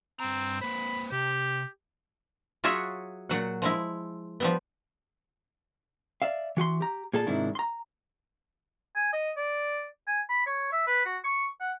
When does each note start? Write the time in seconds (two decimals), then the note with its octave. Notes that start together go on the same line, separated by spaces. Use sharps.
0.20 G2 C4 A#5
0.61 A#3 B4 C5 B5
1.12 C3 G4
2.64 F#3 F4 F#4 G#4 C#5 E5
3.29 A#2 F#3 F#5
3.62 F3 G#3 E4
4.40 F3 G3 B3
6.22 D5 E5 F5
6.57 E3 F#4 G#5 C6
6.81 G4 A#5
7.13 A#2 G#4 A4 D5 A5
7.27 G#2 C3 D#3 D4 E4
7.55 A#5 C6
8.95 G#5
9.13 D#5
9.37 D5
10.07 G#5
10.29 B5
10.46 C#5
10.72 E5
10.87 B4
11.05 F#4
11.24 C#6
11.60 F#5